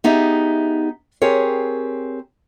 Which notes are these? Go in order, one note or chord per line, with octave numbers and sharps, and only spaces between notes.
B3 D#4 G4 G#4 E5
C4 G4 G#4 A#4 C#5